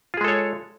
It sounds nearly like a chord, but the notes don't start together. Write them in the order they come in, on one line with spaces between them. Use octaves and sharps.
F4 G#4 G#3 A4 C#5